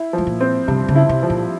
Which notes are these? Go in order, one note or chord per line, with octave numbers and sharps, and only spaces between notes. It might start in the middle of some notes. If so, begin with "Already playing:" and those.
Already playing: E4
G#2 F3
A#2
C4
G2 C3
C#3
E4
C3
F3
A#2